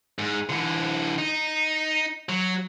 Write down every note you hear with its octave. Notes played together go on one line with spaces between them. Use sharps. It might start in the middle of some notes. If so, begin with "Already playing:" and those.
G#2
D3 E3
D#4
F#3